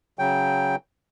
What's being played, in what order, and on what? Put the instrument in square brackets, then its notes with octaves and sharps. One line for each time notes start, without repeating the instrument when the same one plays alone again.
[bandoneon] C#3 F#3 G5